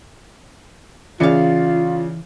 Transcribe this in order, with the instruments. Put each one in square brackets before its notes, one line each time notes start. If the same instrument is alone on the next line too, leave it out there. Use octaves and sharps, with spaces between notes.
[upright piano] C#3 D5 C#7 [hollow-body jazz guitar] E3 F5 [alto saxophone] F4